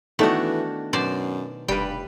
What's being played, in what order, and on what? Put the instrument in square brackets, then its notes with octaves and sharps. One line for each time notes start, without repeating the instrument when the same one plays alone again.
[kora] D#3 D4 F#4 [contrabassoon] E3 [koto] A3 [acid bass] B3
[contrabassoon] F#2 [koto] B2 C5 D5
[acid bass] F1 [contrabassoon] G2 [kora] G3 B4 [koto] G5